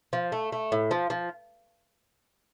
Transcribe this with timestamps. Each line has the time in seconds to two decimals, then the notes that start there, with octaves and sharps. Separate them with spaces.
0.13 F3
0.32 A3
0.52 A3
0.72 A2
0.91 F3
1.10 F3